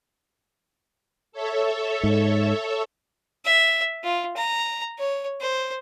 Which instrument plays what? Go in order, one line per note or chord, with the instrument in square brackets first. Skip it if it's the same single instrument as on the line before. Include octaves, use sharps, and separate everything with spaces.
[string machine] A4 C#5 E5
[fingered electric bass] G#2
[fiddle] E5
F4
A#5
C#5
C5